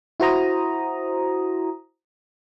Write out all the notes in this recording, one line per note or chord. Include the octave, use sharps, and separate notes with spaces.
E4 F#4 C5 A#5 D#6